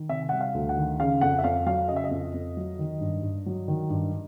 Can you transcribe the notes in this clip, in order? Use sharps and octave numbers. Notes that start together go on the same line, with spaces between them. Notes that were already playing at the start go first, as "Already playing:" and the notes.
Already playing: D#3
C3 E5
G3 F#5
F5
D2
F#5
D#3
C#3 F5
F2 F#5
E5
F2 F5
F#3 F5
C#3 D#5
E5
D#5
F2
F2
F#3
D#3
G2
G2
F#3
D#3
G2